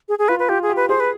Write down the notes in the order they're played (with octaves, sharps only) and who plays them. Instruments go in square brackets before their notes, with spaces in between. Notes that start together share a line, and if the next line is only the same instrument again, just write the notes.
[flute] G#4
G#4
[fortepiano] F4 [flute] B4
[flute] B4
[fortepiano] F4 [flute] G4
[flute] G#4
[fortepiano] G4
[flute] B4
[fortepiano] G#4 [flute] C5
[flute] B4